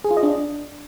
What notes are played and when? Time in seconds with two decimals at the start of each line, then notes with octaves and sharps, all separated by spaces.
0.04 G#4
0.11 F4
0.17 D#5
0.23 D4